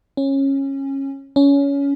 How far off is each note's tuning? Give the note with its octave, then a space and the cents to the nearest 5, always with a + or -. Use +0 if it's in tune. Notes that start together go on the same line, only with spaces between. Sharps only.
C#4 -20
C#4 +20